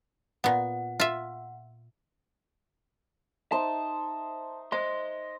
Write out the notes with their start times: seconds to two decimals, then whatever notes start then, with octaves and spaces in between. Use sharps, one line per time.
0.44 A#2 B3 F#5
1.00 F4 E5
3.52 D#4 C5 E5 A5
4.72 C5 D#5 C6